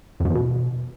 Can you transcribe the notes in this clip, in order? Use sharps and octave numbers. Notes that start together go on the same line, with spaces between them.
F2
F#2
E2
B2